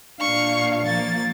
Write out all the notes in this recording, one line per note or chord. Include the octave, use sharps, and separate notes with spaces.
A#2 D4 F5 C#6
F3 A#3 A6